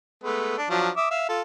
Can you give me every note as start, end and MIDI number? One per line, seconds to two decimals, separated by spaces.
0.24 0.56 56
0.24 0.56 57
0.24 0.56 59
0.58 0.69 62
0.70 0.89 53
0.70 0.89 54
0.70 0.89 62
0.97 1.07 76
0.97 1.07 86
0.97 1.07 87
1.11 1.27 76
1.11 1.27 77
1.29 1.41 65
1.29 1.41 69